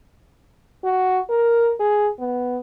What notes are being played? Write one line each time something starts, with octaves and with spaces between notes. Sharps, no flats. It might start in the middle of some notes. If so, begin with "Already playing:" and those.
F#4
A#4
G#4
B3